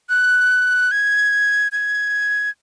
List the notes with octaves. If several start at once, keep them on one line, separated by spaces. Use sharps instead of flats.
F#6
G#6
G#6